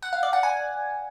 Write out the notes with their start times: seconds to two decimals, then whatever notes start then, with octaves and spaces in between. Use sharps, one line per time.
0.02 F#5
0.13 F5
0.23 D5
0.33 F#5
0.43 G#5